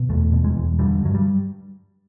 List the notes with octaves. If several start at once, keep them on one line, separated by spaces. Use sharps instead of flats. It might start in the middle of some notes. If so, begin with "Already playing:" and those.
Already playing: B2
E2 A3
B2
G#3
E2
D3 G3
G2 F#3
G3